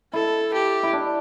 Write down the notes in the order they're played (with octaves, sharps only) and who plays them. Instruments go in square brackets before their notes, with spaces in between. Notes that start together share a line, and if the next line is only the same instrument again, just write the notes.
[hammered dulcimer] E4 [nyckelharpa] A4
[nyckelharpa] G4
[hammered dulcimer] E4
D4